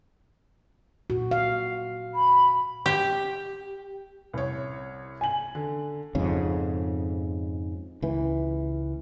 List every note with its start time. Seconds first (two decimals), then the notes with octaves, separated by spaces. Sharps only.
1.10 A#2 F#4
1.31 F5
2.15 B5
2.86 G4
4.34 C2 C#5
5.21 G#5 F#7
5.55 D3
6.15 F2 G#2 C#3
8.02 C#2 E3